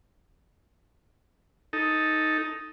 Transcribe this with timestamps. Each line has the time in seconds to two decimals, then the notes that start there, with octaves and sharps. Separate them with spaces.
1.73 D#4 A4